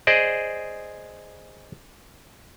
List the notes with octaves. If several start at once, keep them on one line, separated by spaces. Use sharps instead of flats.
G#4 C5 D5 D#5